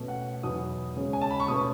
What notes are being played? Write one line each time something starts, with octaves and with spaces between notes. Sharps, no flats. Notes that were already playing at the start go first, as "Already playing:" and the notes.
Already playing: B2 A3 C#4
F#5
E2 B2 F#3 B3 D#4 D#6
C#3 G#3 C#4
G#5
A5
B5
C#6
B2 A3 C#4 D#6